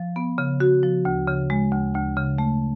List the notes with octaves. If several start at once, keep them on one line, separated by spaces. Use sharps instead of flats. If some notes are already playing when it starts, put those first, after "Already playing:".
Already playing: F3
B3
C#3
F#4
F3
D2
C#3
G#3
D2
D2
C#3
A3